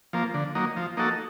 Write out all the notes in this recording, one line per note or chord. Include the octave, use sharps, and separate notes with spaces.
F3 A#3
D3
F#3 A#3 D#4
F3
A#3 D#4 F#4 A4